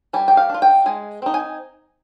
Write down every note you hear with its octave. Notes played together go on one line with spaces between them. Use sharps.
G3 G#5
G5
F5
D4
F4
G5
G#3 G#5
C4 D#4
G#5